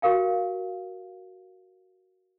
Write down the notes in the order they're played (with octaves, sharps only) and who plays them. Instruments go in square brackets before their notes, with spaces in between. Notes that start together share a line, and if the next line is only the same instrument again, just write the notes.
[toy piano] F#4 G4 A#4 F5 G5